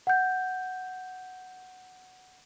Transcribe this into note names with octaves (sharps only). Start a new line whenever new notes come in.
F#5 G6